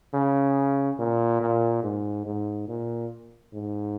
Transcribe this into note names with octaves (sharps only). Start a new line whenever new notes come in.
C#3
A#2
A#2
G#2
G#2
A#2
G#2